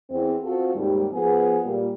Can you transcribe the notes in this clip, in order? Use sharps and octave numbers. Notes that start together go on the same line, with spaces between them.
E2 C4
C4 F4 F#4 A4
D#2 G#2 G3
F3 B3 G#4
A#2 G3